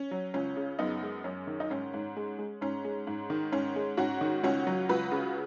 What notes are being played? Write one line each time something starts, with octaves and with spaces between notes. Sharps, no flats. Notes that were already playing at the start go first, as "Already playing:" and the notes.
Already playing: C#4
F#3
C#2 C#4
C#3
F#2 B3 D#4
G#3
F#2 C#4
D#3
D#4
G#2 C#4
G#2
G#3
G#3
G#2 C#4
G#3
G#2
D#3
G#2 C#4
G#3
G#2 C#4 F#4
D#3
C#2 C#4 F#4
F#3
C#2 F#4 B4
C#3